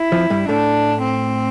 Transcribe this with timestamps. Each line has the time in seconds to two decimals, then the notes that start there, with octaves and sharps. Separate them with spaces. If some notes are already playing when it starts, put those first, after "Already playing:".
Already playing: E4
0.12 F2 F3
0.30 G2 G3
0.48 A2 A3 D4
1.03 C4